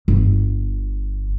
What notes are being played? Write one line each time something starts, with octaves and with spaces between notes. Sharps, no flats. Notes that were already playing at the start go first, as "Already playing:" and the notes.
G1